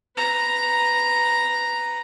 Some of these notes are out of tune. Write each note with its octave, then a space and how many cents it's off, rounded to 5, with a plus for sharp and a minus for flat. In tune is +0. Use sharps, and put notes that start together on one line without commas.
B4 +5 A#5 +0